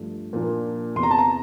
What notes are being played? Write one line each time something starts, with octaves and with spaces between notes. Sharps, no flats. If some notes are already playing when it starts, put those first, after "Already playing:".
Already playing: G2 F3 A3
A#2 F3 A#3 D4
E2 C3 E3 C6
A#5
A5
A#5